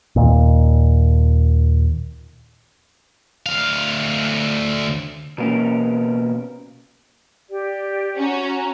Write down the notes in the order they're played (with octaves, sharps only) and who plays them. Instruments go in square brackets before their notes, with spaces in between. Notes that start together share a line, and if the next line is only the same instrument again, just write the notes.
[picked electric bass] D#2 A#2
[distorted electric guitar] D2 F5
[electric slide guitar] B2 A#3 C#4
[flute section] G4 D5
[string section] C#4 F#4 [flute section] A#5